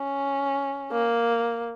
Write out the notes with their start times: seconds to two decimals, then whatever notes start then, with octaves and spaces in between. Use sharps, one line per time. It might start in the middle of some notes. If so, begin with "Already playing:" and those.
Already playing: C#4
0.92 A#3